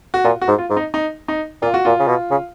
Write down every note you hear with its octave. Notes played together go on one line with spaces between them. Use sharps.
F#4
A#2 F4
F#4
G#2
F4
G#2
D#4
D#4
D#4
A#2 F4
F#4
A#2 F4
C#3
B2
C#3